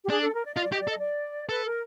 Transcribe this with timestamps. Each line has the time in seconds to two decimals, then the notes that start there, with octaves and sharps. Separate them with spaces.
0.04 G4
0.10 D4 G#4
0.22 A4
0.34 A#4
0.45 D5
0.54 F4 D#5
0.62 D5
0.72 G4 D#5
0.81 D5
0.87 A4
0.90 D#5
0.98 D5
1.49 A4 B4
1.65 A#4